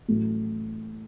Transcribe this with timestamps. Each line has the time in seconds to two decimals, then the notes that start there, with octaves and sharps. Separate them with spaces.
0.08 A1 A2 F#3 A3